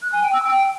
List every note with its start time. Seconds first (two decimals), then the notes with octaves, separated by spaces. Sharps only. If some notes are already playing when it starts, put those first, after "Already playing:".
0.02 F#6
0.12 G#5
0.23 G5
0.33 E6
0.43 G5